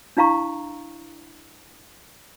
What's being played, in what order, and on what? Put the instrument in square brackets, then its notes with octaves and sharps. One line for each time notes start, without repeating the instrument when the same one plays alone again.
[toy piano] D4 E4 F5 A#5 C#6